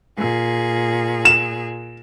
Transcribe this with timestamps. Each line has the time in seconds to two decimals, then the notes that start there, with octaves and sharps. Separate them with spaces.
0.16 A#2 G#4
1.25 E7